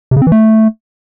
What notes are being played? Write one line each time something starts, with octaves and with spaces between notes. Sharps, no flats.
C3
C#3
C4
E3
A3